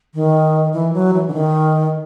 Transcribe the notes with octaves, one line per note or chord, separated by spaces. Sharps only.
D#3
E3
F#3
E3
D3
D#3